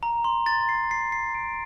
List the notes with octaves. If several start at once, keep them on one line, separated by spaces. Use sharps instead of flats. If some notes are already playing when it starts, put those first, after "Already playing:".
A#5
C6
A6
C7
C7
C7
D7